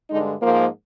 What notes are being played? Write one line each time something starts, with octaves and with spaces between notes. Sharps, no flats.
G2 D3 G#3 D#4
G#2 F3 A#3